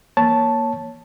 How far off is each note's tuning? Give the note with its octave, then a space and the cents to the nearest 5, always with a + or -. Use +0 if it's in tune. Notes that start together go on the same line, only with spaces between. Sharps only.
A#3 +15 C#5 +0 A5 +0